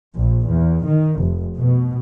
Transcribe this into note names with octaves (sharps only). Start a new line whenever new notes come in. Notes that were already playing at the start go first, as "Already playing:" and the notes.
A#1
E2
D#3
F1
B2